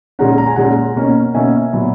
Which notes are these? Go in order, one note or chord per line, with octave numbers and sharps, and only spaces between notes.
A#2 G#3 C#4 F#5 A#5
A#5
G#5
A#2 G#3 C#4 F#5 A#5
B2 A#3 C#4
B2 A#3 C#4 E5 G#5
A#2 F#3 B3